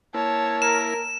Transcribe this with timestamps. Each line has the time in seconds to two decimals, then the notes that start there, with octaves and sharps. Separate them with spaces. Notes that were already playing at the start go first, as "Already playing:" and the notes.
0.14 A#3 E4 C#5 A5
0.62 A#4 E7